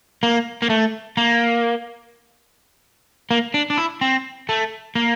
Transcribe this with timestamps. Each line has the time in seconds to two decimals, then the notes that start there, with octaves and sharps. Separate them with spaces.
0.23 A#3
0.62 A#3
0.70 A3
1.17 A#3
3.31 A#3
3.54 D4
3.70 D4
3.78 E4
4.01 C4
4.49 A3
4.95 A#3